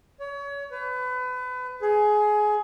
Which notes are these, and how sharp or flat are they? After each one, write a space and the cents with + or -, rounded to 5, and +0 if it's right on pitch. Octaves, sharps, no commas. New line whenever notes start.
C#5 +30
B4 +30
G#4 +20